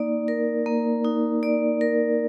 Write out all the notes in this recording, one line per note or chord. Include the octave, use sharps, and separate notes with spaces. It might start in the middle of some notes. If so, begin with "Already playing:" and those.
Already playing: A#3 D#4 D5
A#4
A#3
D#4
D5
A#4